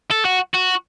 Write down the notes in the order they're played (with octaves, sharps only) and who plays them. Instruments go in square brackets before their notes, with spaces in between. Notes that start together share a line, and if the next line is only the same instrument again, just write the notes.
[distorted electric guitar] A4
F#4
F#4